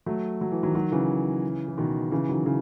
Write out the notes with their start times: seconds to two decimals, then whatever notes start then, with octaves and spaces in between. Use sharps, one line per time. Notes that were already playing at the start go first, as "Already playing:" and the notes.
0.06 F#3 A3
0.41 F#3
0.52 E3
0.63 D#3 F#3
0.75 D#3 F#3
0.92 C#3 E3
1.68 E3
1.78 B2 D#3
2.11 C#3 E3
2.29 D#3 F#3
2.46 C#3 E3